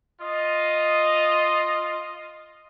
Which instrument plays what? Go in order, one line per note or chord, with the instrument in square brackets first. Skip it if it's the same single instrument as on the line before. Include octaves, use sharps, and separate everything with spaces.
[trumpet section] F4 D#5